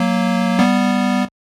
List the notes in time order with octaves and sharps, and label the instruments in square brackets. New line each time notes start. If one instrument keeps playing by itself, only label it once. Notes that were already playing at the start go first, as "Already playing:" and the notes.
Already playing: [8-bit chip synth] F#3 A#3
G3 B3